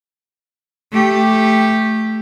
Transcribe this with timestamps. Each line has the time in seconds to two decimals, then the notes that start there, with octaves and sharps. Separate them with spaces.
0.92 A3 G4